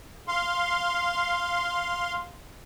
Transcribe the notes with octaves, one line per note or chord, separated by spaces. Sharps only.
F5 C6